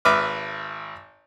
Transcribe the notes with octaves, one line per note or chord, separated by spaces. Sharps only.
G#1 B4 E5 D6 F6